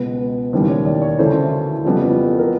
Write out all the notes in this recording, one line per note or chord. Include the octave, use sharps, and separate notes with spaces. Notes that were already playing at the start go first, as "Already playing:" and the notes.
Already playing: C#2 B2 G#3 B3 B4
E1 D#2 C#3 E3 G3 C5
C#5
D5
C#5
D2 C#3 E3 A3 C5
F2 C#3 E3 G3 B3
A4
A#4